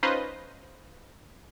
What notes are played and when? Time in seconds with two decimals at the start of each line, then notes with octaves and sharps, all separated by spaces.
0.03 C#4 D#4 F4 B4 C5 D#5